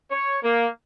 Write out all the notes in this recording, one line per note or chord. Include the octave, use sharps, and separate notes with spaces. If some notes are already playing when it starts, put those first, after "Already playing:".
C#5
A#3